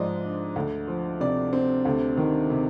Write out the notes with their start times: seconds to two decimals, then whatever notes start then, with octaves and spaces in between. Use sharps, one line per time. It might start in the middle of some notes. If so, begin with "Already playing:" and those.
Already playing: G#2 F3 G#3 D5 D#5
0.23 D4
0.56 D2
0.88 F3
1.20 C3 D5
1.53 C4
1.85 D2
2.17 D#3
2.50 C3